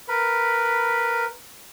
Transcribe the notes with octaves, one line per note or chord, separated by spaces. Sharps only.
A#4 B4 B5